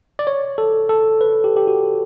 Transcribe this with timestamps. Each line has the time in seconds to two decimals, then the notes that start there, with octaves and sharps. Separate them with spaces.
0.19 D5
0.27 C#5
0.58 A4
0.89 A4
1.21 B4
1.44 G4
1.57 G4
1.67 F#4